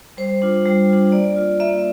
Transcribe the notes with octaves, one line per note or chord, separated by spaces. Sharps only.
G3 C5
D4 F4
G3
D4 F4
A#3 D5
F4
A#3 E5